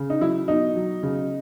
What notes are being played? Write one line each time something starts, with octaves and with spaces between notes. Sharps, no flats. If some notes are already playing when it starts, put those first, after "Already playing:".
Already playing: C#3
D#4
F#3 E4
B2 D#4
F#3
C#3